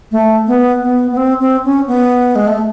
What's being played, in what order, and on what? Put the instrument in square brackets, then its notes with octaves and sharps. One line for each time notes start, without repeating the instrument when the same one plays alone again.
[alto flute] A3
B3
B3
B3
C4
C4
C#4
B3
G#3
A3